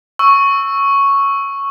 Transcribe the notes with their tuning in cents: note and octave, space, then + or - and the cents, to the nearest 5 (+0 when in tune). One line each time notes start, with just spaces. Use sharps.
C#6 +0 E6 +0